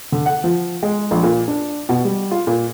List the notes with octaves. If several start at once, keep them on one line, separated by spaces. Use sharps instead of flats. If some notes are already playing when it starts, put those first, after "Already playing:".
D3
F#5
F3
G#3
A#1
A#2
D4
B2
G3
F4
A#2